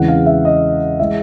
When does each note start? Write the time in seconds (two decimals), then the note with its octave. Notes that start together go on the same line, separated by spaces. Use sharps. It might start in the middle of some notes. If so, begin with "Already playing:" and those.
Already playing: E2 C#3 E3 G#3 C4 F#5
0.08 F5
0.26 E5
0.45 D#5
1.00 E3 G#3 E5